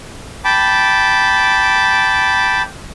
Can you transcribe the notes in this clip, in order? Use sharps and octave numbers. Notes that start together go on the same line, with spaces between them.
G5 A5 B5 D6